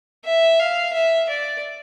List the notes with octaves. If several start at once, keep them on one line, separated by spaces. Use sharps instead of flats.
E5
F5
E5
D5